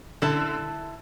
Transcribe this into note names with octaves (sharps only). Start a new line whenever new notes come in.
D3 E4 A4 E5 A5